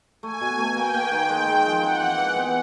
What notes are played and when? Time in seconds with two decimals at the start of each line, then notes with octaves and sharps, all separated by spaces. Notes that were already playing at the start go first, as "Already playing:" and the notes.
0.23 A3 G#5
0.41 B2
0.59 A3
0.76 A#3 G5
0.94 A#3
1.12 D#3
1.29 G#3
1.47 G#3
1.65 F3
1.83 C4 F#5
2.00 E3
2.18 E3
2.36 B3